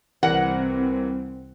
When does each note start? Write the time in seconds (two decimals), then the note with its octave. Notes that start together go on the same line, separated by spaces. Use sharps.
0.23 C2 E3 C4 A#4 F#5